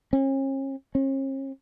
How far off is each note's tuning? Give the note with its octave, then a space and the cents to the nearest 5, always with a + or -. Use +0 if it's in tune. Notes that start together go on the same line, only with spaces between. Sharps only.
C#4 -40
C#4 -45